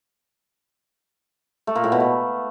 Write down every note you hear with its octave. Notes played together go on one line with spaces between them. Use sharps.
A3
A#2
A2
B2
A3